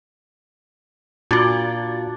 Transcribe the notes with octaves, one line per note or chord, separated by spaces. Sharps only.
A#2 D4 F4 F#4